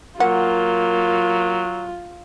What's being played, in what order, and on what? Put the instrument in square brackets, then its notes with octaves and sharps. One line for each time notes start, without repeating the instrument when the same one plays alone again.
[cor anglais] F#3 [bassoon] A#3 [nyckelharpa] F4 [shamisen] F#5